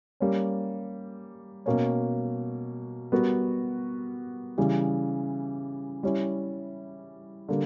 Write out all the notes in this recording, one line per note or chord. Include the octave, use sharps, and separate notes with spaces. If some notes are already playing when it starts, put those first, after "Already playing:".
G3 A#3 C#4
B2 A#3 C#4
G3 B3 F#4 A#4
C#3 E3 G3
G3 C#4 E4
D3 G3 A#3